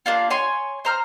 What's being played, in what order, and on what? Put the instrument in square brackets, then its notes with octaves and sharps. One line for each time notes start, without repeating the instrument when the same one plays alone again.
[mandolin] A#3 D4 F4
C#5 G#5 C6
C5 A#5 F6